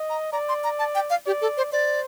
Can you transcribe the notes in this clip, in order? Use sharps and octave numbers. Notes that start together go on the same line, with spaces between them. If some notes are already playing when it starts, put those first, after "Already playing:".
Already playing: D#5
A#5
D5 A#5
C6
A#5
A5
G5
F5
G4 D5
A4
C5
C5 D5